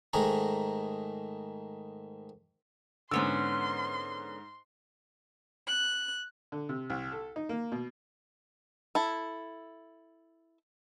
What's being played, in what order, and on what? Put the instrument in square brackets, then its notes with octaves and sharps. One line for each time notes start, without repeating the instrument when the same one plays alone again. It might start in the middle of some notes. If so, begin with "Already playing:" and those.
[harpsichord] G#2 D#3 A3 G#4 A#5
[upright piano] G#2 E6 [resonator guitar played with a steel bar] D3 B3 C#4 [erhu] C6
[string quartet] F#6
[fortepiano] D3
C3
C2
A4
D#4
A#3
B2
[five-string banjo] E4 A4